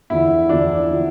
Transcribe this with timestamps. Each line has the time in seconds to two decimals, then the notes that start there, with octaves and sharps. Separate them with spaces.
0.10 E2 D3 F3 E4
0.49 E2 D3 F3 D4
0.90 D3 F3